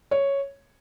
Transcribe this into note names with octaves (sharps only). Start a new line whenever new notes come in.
C#5